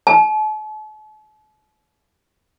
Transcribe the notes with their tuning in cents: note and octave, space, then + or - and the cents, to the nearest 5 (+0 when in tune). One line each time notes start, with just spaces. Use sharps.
A5 -45